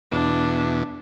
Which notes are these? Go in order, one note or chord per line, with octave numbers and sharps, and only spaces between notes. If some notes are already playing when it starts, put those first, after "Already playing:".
E2 B2 D4